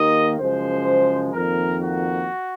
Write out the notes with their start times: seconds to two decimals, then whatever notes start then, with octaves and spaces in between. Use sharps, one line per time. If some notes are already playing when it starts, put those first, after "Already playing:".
Already playing: D#2 D#3 A#3 D#5
0.39 F#2 C#3 F3 G#3 C5
1.33 F2 D#3 A#3 A#4
1.81 F#4